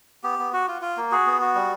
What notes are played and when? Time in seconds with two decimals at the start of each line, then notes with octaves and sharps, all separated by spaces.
0.23 B3 G4
0.39 B3
0.53 F#4
0.68 F4
0.82 F4
0.97 A#3
1.11 F#4 G#4
1.26 B3
1.41 F#4
1.55 G3